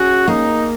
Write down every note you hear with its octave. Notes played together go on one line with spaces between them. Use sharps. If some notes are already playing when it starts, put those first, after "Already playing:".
Already playing: C#4 F#4 G#4
A#3 D#4